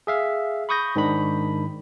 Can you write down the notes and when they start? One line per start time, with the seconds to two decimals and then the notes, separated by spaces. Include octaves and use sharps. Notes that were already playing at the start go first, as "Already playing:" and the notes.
0.07 G#4 E5 F5
0.69 B5 C#6 D#6 G6 A#6
0.96 G#2 D#3 D4 B5